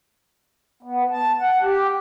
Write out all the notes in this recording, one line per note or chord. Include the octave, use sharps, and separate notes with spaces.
B3
A5
F#5
G4